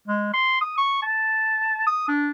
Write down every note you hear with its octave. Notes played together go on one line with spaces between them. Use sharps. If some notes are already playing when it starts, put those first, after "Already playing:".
G#3
C6
D#6
C#6
A5
D#6
D4